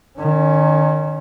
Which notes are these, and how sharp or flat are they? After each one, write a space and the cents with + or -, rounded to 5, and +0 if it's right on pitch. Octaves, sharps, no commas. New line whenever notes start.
D#3 -30 C#4 +0